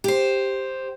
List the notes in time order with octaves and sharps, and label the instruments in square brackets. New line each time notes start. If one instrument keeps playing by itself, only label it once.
[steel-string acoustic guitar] G4 C5